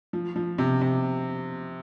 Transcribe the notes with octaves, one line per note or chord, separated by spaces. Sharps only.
F3
F3
C3
C3